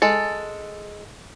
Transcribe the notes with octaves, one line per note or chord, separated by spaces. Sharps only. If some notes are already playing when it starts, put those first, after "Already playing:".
G#3 A4